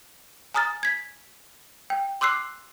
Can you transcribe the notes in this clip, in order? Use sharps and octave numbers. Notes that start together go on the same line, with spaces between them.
G#5 A#5 D#6 F6 A6
G#6 B6
G5
C6 D6 E6 F#6 C7